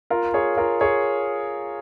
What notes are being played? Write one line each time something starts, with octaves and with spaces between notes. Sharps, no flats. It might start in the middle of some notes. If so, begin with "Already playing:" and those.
F4 A#4
G#4 C#5
F4 A#4
G#4 C#5